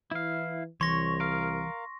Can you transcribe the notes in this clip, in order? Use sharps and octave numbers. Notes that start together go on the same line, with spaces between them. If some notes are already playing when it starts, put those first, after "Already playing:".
E3 E4 F5
C2 E3 C#5 C6 C#6 A#6
A#4 F5